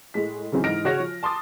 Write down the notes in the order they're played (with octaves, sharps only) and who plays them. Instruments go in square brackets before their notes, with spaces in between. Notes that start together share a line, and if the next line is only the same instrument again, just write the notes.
[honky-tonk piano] A2 G#3 B6
C#3 E3 F#3 C4 C#4 D#4
G#2 E3 D#5 F6 A#6 D7
C#3 F#4 C#5 A#6
F3
A5 C6 D6 D#6 A6